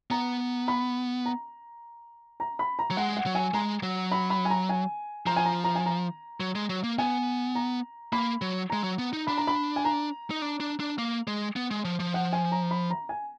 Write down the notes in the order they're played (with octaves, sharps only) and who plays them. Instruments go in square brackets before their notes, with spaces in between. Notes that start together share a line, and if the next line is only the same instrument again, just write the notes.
[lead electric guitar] B3 [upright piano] A#5
[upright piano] B5
A#5
A#5
B5
A#5
[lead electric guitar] F#3
[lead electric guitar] G#3 [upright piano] F#5
[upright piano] F#5
[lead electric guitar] F#3
[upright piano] G#5
[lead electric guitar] G#3 [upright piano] A#5
[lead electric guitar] F#3
[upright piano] B5
B5
G#5
A#5
G#5
[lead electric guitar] F3 [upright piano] A#5
[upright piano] G#5
A#5
A#5
G#5
A#5
[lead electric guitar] F#3
G#3
F#3
A#3
[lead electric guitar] B3 [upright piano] G#5
[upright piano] A#5
[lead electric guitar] A#3 [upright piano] B5
[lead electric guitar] F#3
[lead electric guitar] G#3 [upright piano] A#5
[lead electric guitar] F#3
B3
D#4
[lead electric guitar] D4 [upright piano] B5
[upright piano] A#5
B5
G#5
A#5
[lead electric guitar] D#4
D4
D4
D4
A#3
G#3
B3
G#3
F3
F3
[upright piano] F#5
G#5
A#5
B5
A#5
G#5